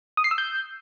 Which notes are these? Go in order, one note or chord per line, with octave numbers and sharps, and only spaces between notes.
D#6
C7
E6
G6